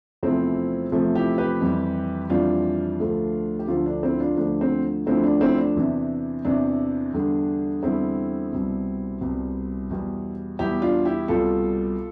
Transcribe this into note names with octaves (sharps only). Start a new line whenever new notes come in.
E2 C3 F3 A3 C4 E4
E2 C3 F3 A3
E4 G4
G4 B4
F2 E3 G3
F2 E3 G3 D4 F4
D2 D3 F3 A3
G4
D2 D3 F3 A3 F4 A4
D4
C4 E4
D4 F4
D2 D3 F3 D4
C4
D2 D3 F3 C4 E4
D4
C4 E4
D4
E2 C3 E3
E2 C3 E3 D4
E2 D3 G3
E2 D3 G3 C4 E4
C2 B2 G3
C2 B2 G3
E2 B2 G3
E2 B2 G3 E4 G4
D4 F4
E4 G4
C2 B2 G3 F4 A4